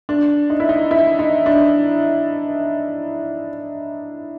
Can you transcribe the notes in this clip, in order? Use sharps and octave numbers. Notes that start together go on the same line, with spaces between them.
D4
D#4
E4
D#4
E4
D#4
D4